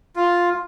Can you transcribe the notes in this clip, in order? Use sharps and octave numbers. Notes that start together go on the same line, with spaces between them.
F4